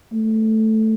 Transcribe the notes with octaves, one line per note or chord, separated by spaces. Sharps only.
A3